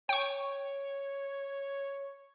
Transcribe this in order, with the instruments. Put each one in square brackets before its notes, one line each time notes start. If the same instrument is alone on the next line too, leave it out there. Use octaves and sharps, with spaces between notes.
[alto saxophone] C#5 [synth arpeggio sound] G5 C#6